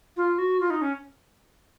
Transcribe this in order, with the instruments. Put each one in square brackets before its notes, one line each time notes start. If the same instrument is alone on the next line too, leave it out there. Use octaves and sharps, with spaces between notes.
[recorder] F4
F#4
F4
D#4
C#4